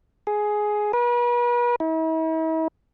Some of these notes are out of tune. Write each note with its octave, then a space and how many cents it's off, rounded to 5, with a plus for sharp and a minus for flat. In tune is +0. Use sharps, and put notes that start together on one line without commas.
G#4 +10
B4 -40
E4 -45